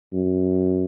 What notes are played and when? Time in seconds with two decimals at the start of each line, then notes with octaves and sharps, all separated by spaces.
0.13 F#2